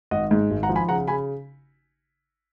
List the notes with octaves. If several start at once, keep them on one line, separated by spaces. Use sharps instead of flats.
G#1 D#5 F#5
G#2
G#1
F#5 A#5
F3
G#5 B5
C#3 F#5 A#5
C#3 G#5 B5